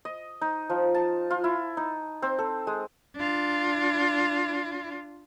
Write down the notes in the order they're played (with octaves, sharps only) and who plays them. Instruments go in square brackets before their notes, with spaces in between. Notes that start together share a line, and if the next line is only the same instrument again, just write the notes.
[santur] D#5
D#4
F3
A5
F4
E4
D#4
C4
A4
G#3
[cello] D4 F4